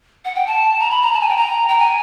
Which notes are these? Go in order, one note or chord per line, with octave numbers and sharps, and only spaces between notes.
F#5
G5
A5
A#5
B5
A#5
A5
G#5
G5
A#5
G5
G#5